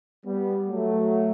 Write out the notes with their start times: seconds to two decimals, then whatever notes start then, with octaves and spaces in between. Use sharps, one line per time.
0.25 G3 B3
0.68 F#3 A3